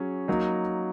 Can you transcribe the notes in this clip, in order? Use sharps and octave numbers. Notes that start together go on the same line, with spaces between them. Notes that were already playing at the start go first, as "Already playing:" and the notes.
Already playing: F#3 C#4 G#4
F#3 A#3 D#4